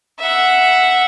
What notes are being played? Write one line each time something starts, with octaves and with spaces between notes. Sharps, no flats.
E5 F#5